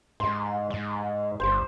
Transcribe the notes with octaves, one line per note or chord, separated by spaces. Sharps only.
G#2 C6
G#2
G1 C5